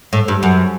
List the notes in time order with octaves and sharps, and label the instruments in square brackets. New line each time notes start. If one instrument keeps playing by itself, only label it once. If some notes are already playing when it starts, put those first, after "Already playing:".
[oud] A2
G2
F#2